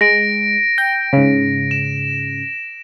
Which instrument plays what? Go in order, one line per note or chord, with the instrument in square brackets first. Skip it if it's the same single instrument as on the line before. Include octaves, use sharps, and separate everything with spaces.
[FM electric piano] G#3 [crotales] A#6 D7
[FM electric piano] G5
G#2 C#3
[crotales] E7